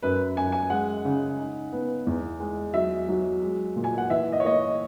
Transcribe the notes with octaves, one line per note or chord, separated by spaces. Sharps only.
F#2 B4
F#2 G#5
G#5
G#3 F#5
C#3
D#4
B3
E2
G#3
F#3 E5
F#3
G#3
A#2
G#5
F#5
E3 E5
D#5
C#5
A#3 D#5